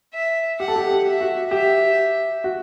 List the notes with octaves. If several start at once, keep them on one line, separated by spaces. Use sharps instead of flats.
E5
G4 F#5
A4
G4
G4
E5
F#4
G4 E5
F#4